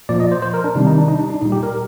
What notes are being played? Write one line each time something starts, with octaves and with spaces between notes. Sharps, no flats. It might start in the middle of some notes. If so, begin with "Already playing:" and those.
A#2 F3 D5
D#5
C5
C5
A#4
D4
C3 D#3 G3 D#4
D#4
D4
D#4
D4
D#4
A#2 G3 D#4
G4
A#4